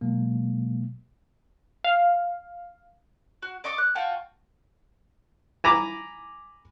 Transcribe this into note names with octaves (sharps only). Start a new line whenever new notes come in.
B2 F#3 G#3 A#3
F5
F#4
D5 D#5 C#6 D6
F#6
F4 F#4 G5 A5
G#5 A#5 B5 D6